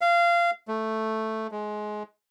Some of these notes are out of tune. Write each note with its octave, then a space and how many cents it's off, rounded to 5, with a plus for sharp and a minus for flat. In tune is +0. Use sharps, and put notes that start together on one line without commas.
F5 -20
A3 +0
G#3 +20